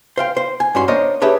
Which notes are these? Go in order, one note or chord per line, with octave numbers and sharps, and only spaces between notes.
C5 F5 G5
C5
G#5
G2 C#4 F#4 C6
A#3 D4 C5 C#5 D#5
D4 G4 G#4 B4 C#5 E5